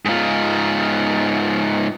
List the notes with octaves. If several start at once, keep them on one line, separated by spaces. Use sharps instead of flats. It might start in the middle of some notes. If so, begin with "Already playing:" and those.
G#2 F4